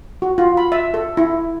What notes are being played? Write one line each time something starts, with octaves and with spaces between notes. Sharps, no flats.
F#4
F4
B5
E5
A4
E4